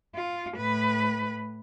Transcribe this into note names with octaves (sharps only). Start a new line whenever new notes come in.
F4
A2 B4